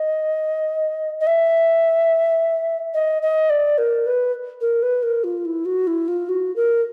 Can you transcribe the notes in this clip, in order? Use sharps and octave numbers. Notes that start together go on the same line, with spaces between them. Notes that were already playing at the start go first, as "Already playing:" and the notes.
Already playing: D#5
D#5
E5
D#5
D#5
D5
A#4
B4
A#4
B4
A#4
F4
E4
F#4
E4
F4
F#4
A#4